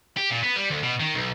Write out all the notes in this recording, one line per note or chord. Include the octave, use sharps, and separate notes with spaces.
G4
A#2
B3
G3
D2
B2
D#3
B1